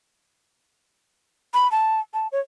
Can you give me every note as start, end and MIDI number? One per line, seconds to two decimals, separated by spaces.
1.54 1.70 83
1.72 2.00 81
2.14 2.28 81
2.32 2.40 73